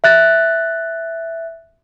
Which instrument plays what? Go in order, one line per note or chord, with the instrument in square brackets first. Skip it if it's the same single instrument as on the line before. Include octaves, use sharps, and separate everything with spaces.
[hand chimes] E5 F#6 A6